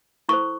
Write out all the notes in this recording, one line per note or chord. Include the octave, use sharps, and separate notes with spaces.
E4 A4 C5 C#6